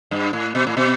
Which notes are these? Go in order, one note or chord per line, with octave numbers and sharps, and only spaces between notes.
G2
A2
B2
A2
B2